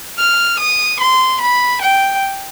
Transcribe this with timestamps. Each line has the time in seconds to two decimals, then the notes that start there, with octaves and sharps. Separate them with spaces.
0.18 F6
0.59 D#6
1.00 C6
1.41 B5
1.82 G5